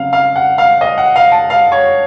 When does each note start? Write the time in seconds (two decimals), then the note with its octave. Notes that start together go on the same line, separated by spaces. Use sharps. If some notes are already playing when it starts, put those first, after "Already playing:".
Already playing: C#3 F#3 C4 F5
0.13 F5
0.36 F#5
0.58 F5
0.81 D#5
0.98 F#5
1.16 F5
1.32 A5
1.50 F5
1.72 C#5